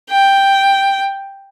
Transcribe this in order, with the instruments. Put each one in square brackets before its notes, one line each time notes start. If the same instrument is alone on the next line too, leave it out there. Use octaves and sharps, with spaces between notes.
[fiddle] G5